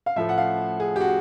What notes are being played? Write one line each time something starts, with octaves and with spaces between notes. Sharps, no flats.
F5
A2 F3 A3 E5
F#5
F5
G#4
G4
F#4